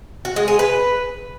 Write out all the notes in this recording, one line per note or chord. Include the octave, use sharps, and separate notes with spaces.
F#4
G#3
G#4
B4